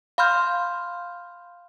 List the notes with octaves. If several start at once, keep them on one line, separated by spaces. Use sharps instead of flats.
F5 B5 C6 F6 G6